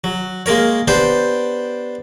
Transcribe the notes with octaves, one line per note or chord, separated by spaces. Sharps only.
F#3
G#3 A#3 A#4 C#5
B3 D4 G4 C5